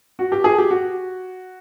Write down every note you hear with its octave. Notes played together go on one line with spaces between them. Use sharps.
F#4
G4
G#4
G4
F#4